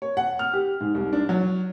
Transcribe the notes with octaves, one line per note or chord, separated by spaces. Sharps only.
C#5
F#5
F6
G4
G#2
C2
D4
F#3